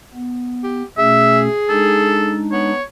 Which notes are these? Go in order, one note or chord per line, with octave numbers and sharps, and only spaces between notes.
B3
G4
B2 A3 C#4 G#4 E5
G#3 D4 D#4 A4
B3 C#5